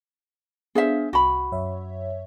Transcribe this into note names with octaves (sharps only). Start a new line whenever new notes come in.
B3 D4 G#4 C5 E5 F5
C2 F#4 B5
F#2 C#5 E5